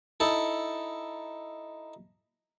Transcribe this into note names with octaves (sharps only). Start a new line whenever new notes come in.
D#4 E4 A4